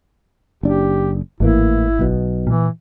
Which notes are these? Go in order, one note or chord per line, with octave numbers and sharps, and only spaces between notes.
F#1 D4 G4
G#1 A2 E3 A#3 E4
B1 B2
A#2 E3